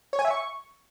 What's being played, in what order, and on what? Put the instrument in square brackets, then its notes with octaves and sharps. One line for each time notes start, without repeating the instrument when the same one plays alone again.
[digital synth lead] C#5
G#5
E5
C#6